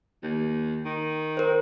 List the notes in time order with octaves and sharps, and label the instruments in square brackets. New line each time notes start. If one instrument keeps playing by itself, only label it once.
[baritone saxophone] D#2
D#3
[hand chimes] A#4 C5